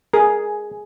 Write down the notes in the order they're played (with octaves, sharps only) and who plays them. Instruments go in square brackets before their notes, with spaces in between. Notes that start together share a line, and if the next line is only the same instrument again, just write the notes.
[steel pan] G#4 [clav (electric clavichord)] A#4